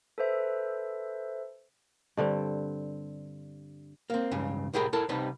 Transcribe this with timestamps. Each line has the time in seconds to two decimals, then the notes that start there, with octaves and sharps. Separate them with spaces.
0.18 A4 B4 C5 E5
2.17 G2 D3 G3 C4
4.10 A#3 C4
4.32 C#2 G2 C#3
4.73 C2 A2 G4 G#4 A#4 B5
4.93 E4 A4 A#4 A5
5.09 C2 C3 G3 D#4 B4 A5